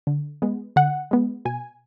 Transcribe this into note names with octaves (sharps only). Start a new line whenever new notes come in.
D3
G#3 B3
D3 F#5
G#3 B3
B2 G#5